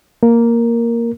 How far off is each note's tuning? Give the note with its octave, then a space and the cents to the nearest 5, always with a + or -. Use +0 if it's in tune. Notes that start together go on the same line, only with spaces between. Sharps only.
A#3 +0 A#4 +0